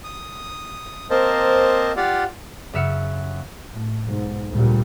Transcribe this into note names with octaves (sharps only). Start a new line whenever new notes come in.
D#6
A#3 C4 A#4 C5 D#5 A5
F4 G4 D5 F5 F#5
F#2 C#3 E5 F5 C#7
A2
B1 G#2
D2 A#2 C#3 G3